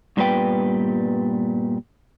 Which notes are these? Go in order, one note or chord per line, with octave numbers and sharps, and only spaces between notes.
G2 A#2 G3 B3 B4 G5